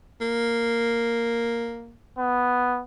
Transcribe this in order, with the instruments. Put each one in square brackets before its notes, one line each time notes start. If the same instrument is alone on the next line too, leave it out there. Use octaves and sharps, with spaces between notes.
[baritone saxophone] A#3
[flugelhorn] B3